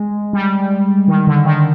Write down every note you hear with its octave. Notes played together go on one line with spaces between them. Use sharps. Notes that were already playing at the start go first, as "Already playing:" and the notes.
Already playing: G#3
G3
D#3
D3
D#3